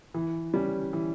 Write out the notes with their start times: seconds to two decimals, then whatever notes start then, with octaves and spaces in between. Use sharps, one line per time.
0.14 E3
0.54 G3 C#4
0.93 E3